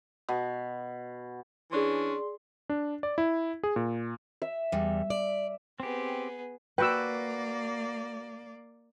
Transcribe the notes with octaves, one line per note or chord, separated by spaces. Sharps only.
B2
E3 C#4 D4 G#4 D5 C6
D4
D5
E4
G#4
A#2
E5
E2 G3
D5
B3 C4 G4 G#4
A#3 F#4 B4 D5 G5 E6